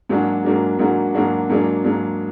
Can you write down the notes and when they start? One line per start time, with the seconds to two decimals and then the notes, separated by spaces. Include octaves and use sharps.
0.09 G#2 F#3 A#3 D4 F#4
0.44 G#2 F#3 A#3 D4 F#4
0.79 G#2 F#3 A#3 D4 F#4
1.14 G#2 F#3 A#3 D4 F#4
1.49 G#2 F#3 A#3 D4
1.84 G#2 F#3 A#3 D4